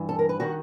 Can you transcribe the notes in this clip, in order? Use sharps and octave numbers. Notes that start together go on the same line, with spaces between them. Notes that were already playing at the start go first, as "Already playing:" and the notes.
Already playing: G2 E3
A4
A#4
B4
D#3 F#4